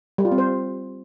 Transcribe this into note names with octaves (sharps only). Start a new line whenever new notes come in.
G3
F4
C4
C5